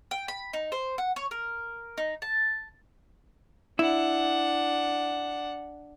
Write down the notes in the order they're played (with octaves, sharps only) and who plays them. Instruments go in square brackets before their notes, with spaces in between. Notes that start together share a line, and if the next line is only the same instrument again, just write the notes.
[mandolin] G5
B5
D#4
C5
F#5
C#5
A#4
D#4
A5
[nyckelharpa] D4 F#5 [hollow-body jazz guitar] E4